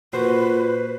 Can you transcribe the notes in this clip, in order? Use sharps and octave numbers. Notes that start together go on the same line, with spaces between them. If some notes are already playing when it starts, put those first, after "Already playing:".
A#2 F#4 B4 C5